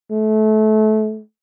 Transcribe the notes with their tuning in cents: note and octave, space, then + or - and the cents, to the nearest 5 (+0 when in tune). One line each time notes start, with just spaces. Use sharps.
A3 -25